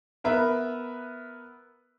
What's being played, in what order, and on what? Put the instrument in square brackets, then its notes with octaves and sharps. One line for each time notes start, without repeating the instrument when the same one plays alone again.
[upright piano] B3 A#4 B4 E5